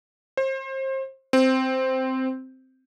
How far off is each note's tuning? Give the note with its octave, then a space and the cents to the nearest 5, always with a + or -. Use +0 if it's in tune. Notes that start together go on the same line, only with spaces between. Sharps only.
C5 +30
C4 -5